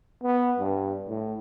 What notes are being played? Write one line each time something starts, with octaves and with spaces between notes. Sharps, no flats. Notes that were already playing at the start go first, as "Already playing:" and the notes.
B3
G2
A2